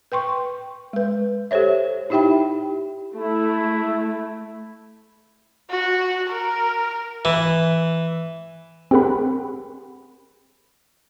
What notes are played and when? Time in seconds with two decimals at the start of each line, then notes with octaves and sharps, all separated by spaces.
0.12 B4 G5 C6 C#6
0.93 G#3 B4
1.51 G4 A4 C5 C#5 E5
2.10 D#4 E4 G4 E5 G5 B5
3.16 A3 E4
5.70 F#4
6.30 A#4
7.25 E3
8.91 C4 G4 G#4 A#4 F#5 B5